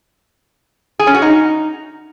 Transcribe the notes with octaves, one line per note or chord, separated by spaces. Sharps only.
G#4
C#4
F#4
D#4